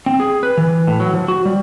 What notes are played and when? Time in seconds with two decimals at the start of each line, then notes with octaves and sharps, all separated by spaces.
0.06 C4
0.20 G#4
0.43 B4
0.58 E3
0.87 A2
1.00 F#3
1.14 F3
1.28 F#4
1.45 G3